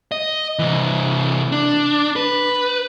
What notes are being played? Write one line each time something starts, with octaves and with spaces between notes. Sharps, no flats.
D#5
C3 E3
D4
B4